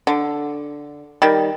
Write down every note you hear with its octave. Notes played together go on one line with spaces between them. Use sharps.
D3
D#3 G3